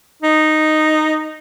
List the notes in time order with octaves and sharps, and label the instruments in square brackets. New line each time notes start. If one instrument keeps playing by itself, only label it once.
[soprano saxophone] D#4